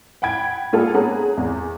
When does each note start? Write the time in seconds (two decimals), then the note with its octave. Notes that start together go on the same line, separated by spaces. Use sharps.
0.22 F#5 G5 B5 G#6 D7
0.73 A#3 F4 G#4 A4
0.94 B3 C#4 G#4 A#5
1.37 E2